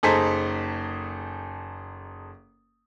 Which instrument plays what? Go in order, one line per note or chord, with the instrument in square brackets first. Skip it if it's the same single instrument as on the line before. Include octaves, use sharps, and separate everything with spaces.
[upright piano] F#1 D#4 G#4 A4 C5 B6